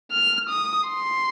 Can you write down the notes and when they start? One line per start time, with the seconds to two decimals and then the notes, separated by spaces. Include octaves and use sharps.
0.12 F6
0.50 D#6
0.89 C6